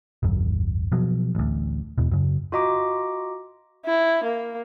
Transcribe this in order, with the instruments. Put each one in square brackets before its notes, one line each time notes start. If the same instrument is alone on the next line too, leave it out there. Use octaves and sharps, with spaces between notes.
[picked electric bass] D#1 G#1 F#2
B2 F3 F#3
A1 D2
E2 B2
F#2 C#3
[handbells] F4 F#4 D#5 A#5 D6
[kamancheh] E4
A#3